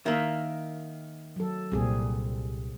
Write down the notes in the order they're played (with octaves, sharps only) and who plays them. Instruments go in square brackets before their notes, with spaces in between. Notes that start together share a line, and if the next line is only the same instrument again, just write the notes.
[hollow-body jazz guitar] D#3 A#3 [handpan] E5
[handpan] F#3 A4
[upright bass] C2 A#2 [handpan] G3 C4 G#4